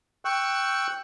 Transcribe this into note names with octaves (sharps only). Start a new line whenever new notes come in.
G5 C#6 E6 F#6